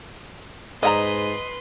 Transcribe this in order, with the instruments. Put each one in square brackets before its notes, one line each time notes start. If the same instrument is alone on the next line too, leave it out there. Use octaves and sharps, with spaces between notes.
[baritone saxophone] G#2 [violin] B4 C6 [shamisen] D5 F5 A#5 [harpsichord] D#5